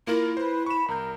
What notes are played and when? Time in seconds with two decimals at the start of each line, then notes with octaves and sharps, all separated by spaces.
0.07 A#3 E4 F4 A#4
0.37 B4 C5
0.66 B5 C#6 E7
0.88 C2 A#4 G6